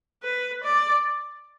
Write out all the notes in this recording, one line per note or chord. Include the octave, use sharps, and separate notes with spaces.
B4
D5